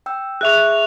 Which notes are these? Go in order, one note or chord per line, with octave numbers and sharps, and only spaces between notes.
G5 E6
G#4 E5 C#6 F#6 F7